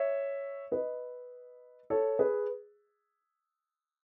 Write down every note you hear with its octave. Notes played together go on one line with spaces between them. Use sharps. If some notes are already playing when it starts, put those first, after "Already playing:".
Already playing: C#5 E5
B4 D#5
A4 C#5
G#4 B4